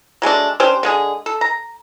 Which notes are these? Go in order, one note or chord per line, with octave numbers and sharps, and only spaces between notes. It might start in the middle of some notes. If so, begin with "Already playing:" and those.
F#3 G#3 A3 D4
C#4 D4 G4 C5
D3 G#3 G#4
A4
A#5